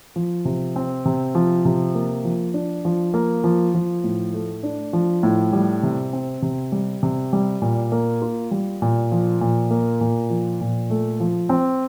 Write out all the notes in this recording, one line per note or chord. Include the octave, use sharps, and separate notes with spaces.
F3
C3
C4
C3
F3
C3
A#3
F3
D4
F3
A#3
F3
F3
A2
A3
D4
F3
A2
G3
C3
C4
C3
G3
C3
G3
A#2
A#3
F4
G3
A#2
F3
A#2
A#3
A#2
F3
A#2
A3
F3
C4